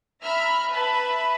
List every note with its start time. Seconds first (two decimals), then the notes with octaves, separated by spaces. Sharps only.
0.23 E5 A#5 B5 F6
0.71 B4 E5 A5 B5